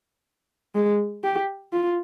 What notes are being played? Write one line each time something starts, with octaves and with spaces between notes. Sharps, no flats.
G#3
G4
F4